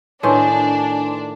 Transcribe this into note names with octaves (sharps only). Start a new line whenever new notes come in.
A2 D#3 D4 B4 G#5 C6